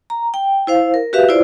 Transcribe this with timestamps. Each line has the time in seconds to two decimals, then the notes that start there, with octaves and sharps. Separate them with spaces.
0.10 A#5
0.34 G5
0.67 E4 C5 F5
0.94 A#4
1.13 F#4 G4 B4 E5 F5
1.29 E4 F4 C5 D5